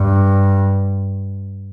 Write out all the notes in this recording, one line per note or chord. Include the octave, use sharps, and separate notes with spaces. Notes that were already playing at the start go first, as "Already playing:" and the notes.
Already playing: G2